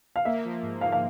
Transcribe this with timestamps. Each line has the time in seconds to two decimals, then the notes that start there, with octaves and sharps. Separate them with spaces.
0.16 F5
0.25 A#3 E5
0.45 F3
0.62 G#2
0.81 G#2 F5
0.92 F5